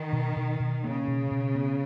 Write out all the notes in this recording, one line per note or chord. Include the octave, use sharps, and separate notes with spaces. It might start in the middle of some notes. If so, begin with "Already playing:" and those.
Already playing: D#3
B2
B2
B2
C#3 A#3
B2
B2
B3